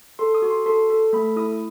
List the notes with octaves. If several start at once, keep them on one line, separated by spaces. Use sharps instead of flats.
A4 C6
D#6
F#4
C6
A4 C6
A4
A3 B5
E4 D#6